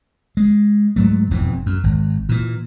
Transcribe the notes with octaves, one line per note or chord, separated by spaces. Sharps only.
G#3
G#2 F#3 A3
E1 F2 G#2 E3
F#2
G#1
A#2 E3